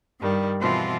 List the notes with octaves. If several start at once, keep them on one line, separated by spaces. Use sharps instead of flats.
G2 D#3 G3
B2 E3 F3 C4 F4